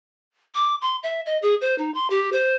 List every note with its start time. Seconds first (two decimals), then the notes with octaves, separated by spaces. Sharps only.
0.55 D6
0.81 C6
1.03 E5
1.26 D#5
1.42 G#4
1.61 C5
1.78 D#4
1.94 C6
2.10 G4
2.32 C5